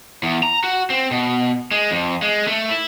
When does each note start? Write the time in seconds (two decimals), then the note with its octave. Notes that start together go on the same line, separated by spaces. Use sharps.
0.23 E2
0.43 A#5
0.64 F#4
0.90 C4
1.11 B2
1.71 G#3
1.91 F2
2.22 G#3
2.48 A3
2.69 E4